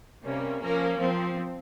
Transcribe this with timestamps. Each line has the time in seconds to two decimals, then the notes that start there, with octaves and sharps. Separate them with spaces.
0.23 C3 G3 A#3 C#4
0.61 F3 A#3 C#4 A#4
0.98 F3 C4